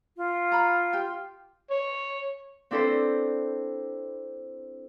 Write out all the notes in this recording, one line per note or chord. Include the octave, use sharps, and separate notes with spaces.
F4
A#5 B5
G4 G5
C#5
C4 D4 E4 A4 B4 C5